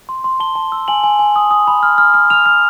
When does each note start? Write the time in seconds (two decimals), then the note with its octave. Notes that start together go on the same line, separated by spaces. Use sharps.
0.09 C6
0.24 C6
0.40 A5 G7
0.55 A5
0.72 E6
0.88 G#5 F#7
1.04 G#5
1.19 G#5
1.36 D#6
1.51 D#6
1.67 B5
1.83 F6
1.98 F6
2.14 F6
2.30 F6 F7
2.46 F6